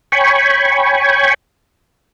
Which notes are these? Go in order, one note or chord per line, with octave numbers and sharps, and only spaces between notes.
C#5 G5 G#5 B5 C#6